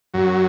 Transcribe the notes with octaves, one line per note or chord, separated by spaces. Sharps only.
F#2 F#3